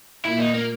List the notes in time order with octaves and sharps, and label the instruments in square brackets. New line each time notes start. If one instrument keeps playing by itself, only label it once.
[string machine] A#2 A#3 [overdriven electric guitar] E4
[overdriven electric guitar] D#4
A#3